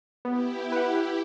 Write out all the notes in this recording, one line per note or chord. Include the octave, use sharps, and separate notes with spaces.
B3 E4 G4
B4 F#5